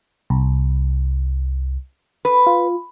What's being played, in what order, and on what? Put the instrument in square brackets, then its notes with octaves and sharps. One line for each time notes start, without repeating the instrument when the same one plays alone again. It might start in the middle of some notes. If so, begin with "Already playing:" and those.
[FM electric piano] C2
[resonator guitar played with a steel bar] B4
[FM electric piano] F4